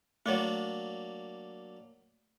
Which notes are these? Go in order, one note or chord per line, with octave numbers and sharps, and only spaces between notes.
F#3 A3 A#3 D4 C#5